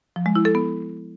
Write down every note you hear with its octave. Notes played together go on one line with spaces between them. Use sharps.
F3
G#3
E4
A4
B3